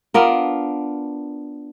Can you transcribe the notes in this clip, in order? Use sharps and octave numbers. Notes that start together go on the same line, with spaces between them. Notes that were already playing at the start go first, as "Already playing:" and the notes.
B3 D4 F4 A#4